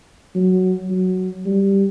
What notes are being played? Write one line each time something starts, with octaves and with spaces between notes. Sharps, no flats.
F#3
F#3
G3